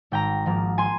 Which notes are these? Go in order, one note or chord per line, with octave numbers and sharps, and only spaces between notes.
G#1 G5 A#5
G#2 F3 A#3
G#5 C6